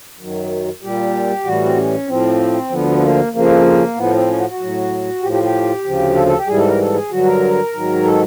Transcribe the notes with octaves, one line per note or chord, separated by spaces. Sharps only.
F#2 D#3 F#3
A#2 G3 G4
A2 E3 G3 F#4
C4
C#4
A2 F3 C4
D2 D3 F3 B3
A#3
F2 C#3 F3 A#3
A2 F3 B3
C4
C#4
F#4
F#4
A2 F#3
A2 F3 G4
G4
G4
D2 C#3 F3
A4
A4
G4
G#2 E3 G3 G#4
A4
A#4
A4
G#4
G2 D3 F#3 F#4
A#4
G#2 D#3 F#3
A4